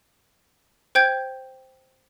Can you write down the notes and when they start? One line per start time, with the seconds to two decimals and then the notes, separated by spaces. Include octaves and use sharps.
0.95 C5 G5 G6 G#6